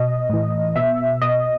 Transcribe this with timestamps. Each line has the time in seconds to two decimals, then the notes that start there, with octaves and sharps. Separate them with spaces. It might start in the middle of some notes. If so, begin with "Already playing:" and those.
Already playing: B2 D#5
0.29 A2 E3
0.76 B2 E5
1.21 B2 D#5